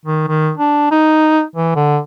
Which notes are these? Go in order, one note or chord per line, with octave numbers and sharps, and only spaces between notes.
D#3
D#3
D4
D#4
E3
D3